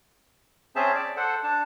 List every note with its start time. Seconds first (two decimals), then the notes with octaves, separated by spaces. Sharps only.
0.76 C4 C#4 G#4 C5 E5 A5
0.95 D5
1.17 A4 C5 F#5
1.43 D4 A5